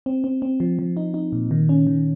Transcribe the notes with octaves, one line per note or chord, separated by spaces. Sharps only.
C4
C4
C4
F3
F3
D#4
D#4
A#2
D#3
C#4
D#3